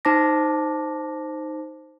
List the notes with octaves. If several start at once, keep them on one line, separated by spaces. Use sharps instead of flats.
D#4 C5 A5 D6 A#6